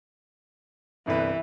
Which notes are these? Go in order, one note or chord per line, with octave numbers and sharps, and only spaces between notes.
G1 C2 E3 B4